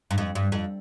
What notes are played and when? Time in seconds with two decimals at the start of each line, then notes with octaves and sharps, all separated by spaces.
0.11 G2
0.18 F2
0.35 G2
0.52 F2